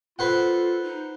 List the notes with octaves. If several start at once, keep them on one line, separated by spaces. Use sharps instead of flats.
F4 A4 B4 C5 F#5
D#4